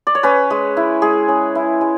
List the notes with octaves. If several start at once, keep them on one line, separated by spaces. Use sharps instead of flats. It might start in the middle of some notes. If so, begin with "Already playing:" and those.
D5
C#5
C#4 B4
G#3
E4
G#3 G#4
C#4
E4
G#3